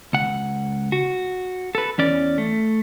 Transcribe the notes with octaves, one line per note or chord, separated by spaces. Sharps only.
C#2 F#5
F#4
A4 B4
E2 C#4 D5
A3